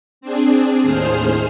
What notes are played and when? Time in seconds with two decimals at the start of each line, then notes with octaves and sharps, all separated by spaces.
0.21 C4 D4 G#4
0.82 D#2 A2 G#4 C5 F6